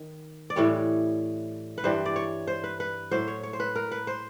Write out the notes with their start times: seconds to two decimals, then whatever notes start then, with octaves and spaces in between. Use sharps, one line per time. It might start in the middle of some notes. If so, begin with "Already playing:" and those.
Already playing: D#3
0.50 D5
0.56 A2 E3 G3 C#5
1.78 B4
1.84 G2 E3 G3 C5
2.06 D5
2.16 C#5
2.47 C5
2.64 B4
2.80 B4
3.11 A2 F#3 C5
3.28 C#5
3.43 C#5
3.53 C5
3.60 B4
3.76 A#4
3.92 B4
4.07 C5